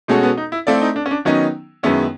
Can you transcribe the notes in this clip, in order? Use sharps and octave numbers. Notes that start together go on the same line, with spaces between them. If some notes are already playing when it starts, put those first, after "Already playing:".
B2 G#3 A3 C#4 F#4 A4
B3
D#4
E4
A3 C4 E4 F4 A4 D5
D#4
D4
C#4
D4
D#3 F#3 B3 C#4 D#4
F#2 D#3 G#3 B3 C#4 E4